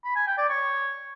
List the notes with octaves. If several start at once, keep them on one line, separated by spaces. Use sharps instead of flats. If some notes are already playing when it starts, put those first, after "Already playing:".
B5
G#5
G5
D5
C#5